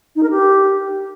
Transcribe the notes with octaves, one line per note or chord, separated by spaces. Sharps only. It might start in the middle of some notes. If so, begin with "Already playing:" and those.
D#4
A#4
G4